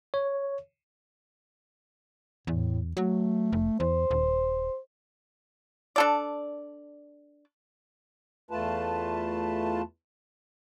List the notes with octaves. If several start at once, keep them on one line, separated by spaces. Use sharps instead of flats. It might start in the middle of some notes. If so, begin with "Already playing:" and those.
C#5
E2 A2
F#3 A3
F1
E2 C5
D#1
D4 A4 D5
E2 A3 F4 B4 A5